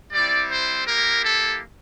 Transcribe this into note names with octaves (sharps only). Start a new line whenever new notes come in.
G3 C4 E4 D5
C5
A#3 E4 G4 A#4
A4